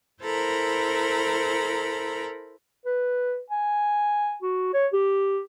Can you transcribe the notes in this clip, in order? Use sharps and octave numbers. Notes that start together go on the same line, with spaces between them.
E4 A4 A#4 C5 A#5 B5
B4
G#5
F#4
C#5
G4